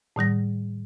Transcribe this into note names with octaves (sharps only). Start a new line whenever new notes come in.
A2 D#3 G3 A#6